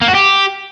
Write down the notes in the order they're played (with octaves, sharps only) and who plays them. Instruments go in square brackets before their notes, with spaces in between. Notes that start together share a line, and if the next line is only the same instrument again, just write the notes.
[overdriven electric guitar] A#3
F#4
G4